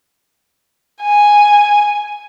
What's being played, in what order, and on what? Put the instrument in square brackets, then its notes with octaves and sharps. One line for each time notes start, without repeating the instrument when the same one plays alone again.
[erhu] G#5